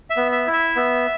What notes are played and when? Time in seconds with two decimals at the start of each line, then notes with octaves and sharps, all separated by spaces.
0.10 E5
0.16 B3
0.32 E5
0.47 E4
0.53 E5
0.76 B3